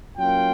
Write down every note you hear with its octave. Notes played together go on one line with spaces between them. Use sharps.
F#3 A#3 C#4 F4 G5